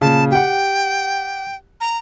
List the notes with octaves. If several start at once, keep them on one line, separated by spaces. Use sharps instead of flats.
A#2 C#3 A5
G4 F#5 G5
A#5